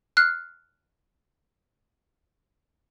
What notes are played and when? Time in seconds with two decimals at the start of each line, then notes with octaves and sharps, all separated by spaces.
0.17 F6 F#6 C7